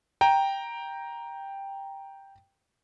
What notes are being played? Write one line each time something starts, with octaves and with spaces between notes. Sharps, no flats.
G5 A#5